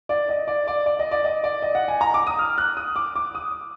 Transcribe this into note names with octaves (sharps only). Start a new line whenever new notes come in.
D5
D#5
D5
D5
D5
D#5
D5
D#5
D5
D#5
F#5
G#5
A#5
D6
D#6
F6
F#6
D#6
D6
D6
D#6